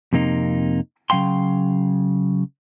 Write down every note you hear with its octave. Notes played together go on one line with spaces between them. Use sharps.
F2 C3 A#3 D#4
C#3 F#3 F5 G5 C6